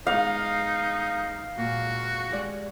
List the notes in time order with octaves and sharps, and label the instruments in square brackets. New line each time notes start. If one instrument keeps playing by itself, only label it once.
[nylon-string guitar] G#3 B3 [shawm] D#4 [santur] F5
[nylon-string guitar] A#2 G#3 [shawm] F#4
[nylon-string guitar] G3 G#3 D5